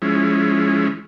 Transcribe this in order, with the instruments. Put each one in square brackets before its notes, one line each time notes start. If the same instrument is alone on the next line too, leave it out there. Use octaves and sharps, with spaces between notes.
[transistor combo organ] F3 G#3 C#4 E4